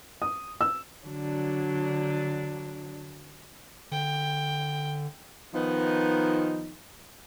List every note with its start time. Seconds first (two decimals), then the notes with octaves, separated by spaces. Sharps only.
0.22 D#6
0.61 E6
1.06 D3 F#3 D4
3.92 D3 G5
5.53 D#3 F3 B3 D#4